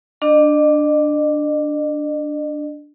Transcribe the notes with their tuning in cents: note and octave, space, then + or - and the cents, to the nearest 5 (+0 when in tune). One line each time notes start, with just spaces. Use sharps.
D4 +0 D#5 -45